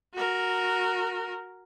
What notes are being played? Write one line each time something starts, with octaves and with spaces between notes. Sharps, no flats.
F#4 A#4